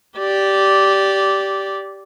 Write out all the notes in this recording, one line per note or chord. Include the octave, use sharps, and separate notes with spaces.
G4 D5